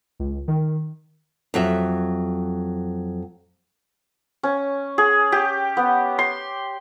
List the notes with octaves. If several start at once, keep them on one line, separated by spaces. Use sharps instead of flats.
C#2
D#3
F2 F#3 E5
C#4
G#4
G4
B3
C6